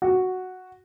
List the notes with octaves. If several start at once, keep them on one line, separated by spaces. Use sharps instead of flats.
F#4